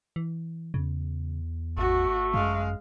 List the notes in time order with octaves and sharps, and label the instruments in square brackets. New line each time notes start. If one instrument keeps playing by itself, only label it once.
[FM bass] E3
[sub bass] E2 [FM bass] C#3
[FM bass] G#1 [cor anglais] A3 [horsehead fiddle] F#4
[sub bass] F#2 [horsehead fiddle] G#3 F5